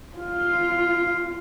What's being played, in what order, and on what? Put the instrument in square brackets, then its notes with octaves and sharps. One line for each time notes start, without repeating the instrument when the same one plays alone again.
[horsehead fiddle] F4 [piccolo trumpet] F5